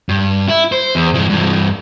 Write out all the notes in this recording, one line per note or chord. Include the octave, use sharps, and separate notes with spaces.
G2
E4
C5
E2
G2 E3
G2 E3